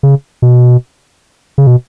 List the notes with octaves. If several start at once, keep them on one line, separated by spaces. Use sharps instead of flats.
C#3
B2
C#3
B2